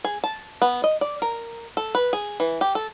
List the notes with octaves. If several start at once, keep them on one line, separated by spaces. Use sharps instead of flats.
G#4
A5
B3
D#5
D5
A#4
A4
B4
G#4
E3
G4
A4